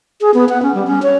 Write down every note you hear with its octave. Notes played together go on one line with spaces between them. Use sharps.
G#4
B3
F#5
C#4
G3
C#4
C#5